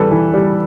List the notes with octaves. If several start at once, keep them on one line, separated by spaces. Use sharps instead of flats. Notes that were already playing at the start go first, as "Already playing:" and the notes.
Already playing: E3 G3 A4 B4
E3
G3